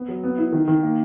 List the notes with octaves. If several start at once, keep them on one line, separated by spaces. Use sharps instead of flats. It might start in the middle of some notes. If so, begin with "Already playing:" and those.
Already playing: B3
F#3
B3
E4
D#3
D#3
A#3